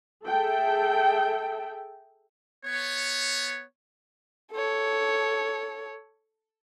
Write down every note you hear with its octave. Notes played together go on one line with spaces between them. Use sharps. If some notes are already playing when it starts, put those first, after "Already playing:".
G#4 A4 E5 G5
B3 C#5
A4 C#5